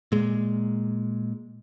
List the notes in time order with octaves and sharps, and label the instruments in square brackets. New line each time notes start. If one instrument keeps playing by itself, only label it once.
[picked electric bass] A#2 G#3